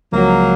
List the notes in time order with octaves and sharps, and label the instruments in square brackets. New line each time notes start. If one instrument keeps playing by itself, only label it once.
[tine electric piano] C#2 C#3 F3 G#3 [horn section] F#3 A#3